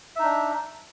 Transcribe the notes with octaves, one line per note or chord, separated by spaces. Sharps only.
D4 D#4 E5